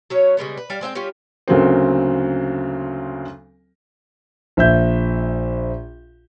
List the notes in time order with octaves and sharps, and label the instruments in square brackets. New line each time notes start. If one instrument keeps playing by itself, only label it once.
[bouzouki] F#3 C#4 C#5
C#3 G3 G#3 B3
B4
G3 D5 F5
G#3 C4 F5 G5
G3 C#4 F4 G4
[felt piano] D2 C#3 F#3 A#3 C4
[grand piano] A#1 E5 G6